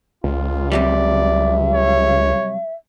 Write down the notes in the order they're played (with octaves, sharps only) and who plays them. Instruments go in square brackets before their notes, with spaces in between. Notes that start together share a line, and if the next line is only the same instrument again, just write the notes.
[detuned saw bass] C#2 [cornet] F4
[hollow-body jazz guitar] C3 F#3 G3 [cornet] D5 [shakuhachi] E5
[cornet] C#5